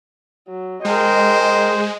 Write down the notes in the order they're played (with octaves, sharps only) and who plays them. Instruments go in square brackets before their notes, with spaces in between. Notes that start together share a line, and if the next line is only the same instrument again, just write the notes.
[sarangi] F#3
[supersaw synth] G#3 [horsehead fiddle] A#4 G5 [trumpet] C5 [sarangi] D#5